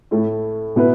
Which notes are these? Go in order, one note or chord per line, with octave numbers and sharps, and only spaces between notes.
A2 A3 E4
B2 B3 E4 B4